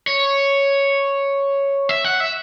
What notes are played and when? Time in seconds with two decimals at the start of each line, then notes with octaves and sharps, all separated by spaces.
0.07 C#5
1.89 E5
2.05 F#5
2.20 E5